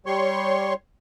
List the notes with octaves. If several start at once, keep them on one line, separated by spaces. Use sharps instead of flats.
G3 C#5 C6 C#6